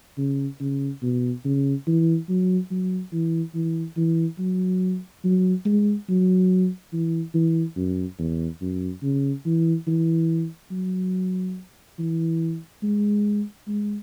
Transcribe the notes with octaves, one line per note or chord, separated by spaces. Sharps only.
C#3
C#3
B2
C#3
E3
F#3
F#3
E3
E3
E3
F#3
F#3
G#3
F#3
E3
E3
F#2
E2
F#2
C#3
E3
E3
F#3
E3
G#3
G#3